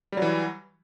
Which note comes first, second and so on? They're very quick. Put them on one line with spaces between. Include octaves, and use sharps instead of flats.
G3 F#3 E3